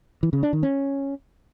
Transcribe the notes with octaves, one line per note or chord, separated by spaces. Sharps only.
E3
C#3
D4
D#3
C#4